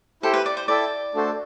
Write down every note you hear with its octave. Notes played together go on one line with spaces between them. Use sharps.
E4 G4 A4 C5 G5
B4
D5
C5
E4 A4 D5 E5 G5
A3 D4 F#4 A4 C5